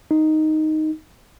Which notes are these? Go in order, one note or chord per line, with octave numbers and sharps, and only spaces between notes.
D#4